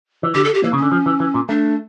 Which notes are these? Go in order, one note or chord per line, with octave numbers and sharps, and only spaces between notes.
E3
D3 G4
A4
G4
E3 A#3
C#3
C#4
D3
F3
E3
E3
A#2
A3 D4